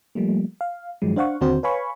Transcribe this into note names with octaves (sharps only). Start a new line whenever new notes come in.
F3 G3 A3 A#3
F5
G2 D#3 F3 F#3 G#3
D4 C5 F5 F#5 C#6
D#2 D3 C4 F#4 C5
B4 C#5 F5 G#5 B5 C#6